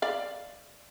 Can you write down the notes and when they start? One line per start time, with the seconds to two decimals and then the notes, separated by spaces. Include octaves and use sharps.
0.02 D5 F5